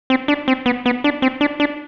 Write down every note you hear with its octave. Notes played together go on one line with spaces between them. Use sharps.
C4
D4
C4
B3
B3
D4
C4
D4
D4